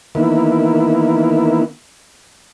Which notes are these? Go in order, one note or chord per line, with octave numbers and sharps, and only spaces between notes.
D#3 E3 A#3 B3 E4